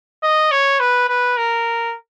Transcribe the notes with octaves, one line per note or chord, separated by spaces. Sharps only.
D#5
C#5
B4
B4
A#4